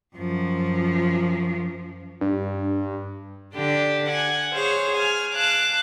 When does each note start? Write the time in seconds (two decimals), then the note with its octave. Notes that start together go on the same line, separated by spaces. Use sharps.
0.15 F#2 F3
2.21 G2
3.54 D3 D4 G4
4.08 F#5 G#5
4.53 G#4 C5 C#5 F5
4.95 G#5 F6
5.35 F5 A5 D6 F#6